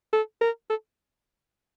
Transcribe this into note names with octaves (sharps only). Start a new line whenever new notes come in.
A4
A#4
A4